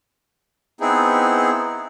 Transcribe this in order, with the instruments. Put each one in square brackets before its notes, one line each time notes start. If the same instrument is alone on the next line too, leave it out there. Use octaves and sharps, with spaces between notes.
[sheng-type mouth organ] B3 C4 D#4 E4 G#4